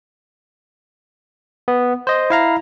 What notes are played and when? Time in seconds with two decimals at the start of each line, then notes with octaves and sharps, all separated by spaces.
1.68 B3
2.07 C5 D#5
2.30 E4 F5 A#5